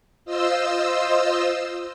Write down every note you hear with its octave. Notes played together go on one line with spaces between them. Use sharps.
F4 C5 D#5 E6